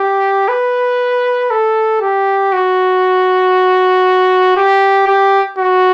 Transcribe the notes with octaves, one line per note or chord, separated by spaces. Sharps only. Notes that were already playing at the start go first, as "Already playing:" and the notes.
Already playing: G4
B4
A4
G4
F#4
G4
G4
F#4